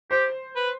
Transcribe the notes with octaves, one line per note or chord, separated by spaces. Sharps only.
G4 C5
B4